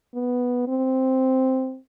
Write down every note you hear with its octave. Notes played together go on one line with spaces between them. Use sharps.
B3
C4